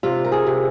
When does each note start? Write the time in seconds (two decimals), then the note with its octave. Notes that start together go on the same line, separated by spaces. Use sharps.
0.03 C3 F4
0.25 A#4
0.32 G#4
0.47 C3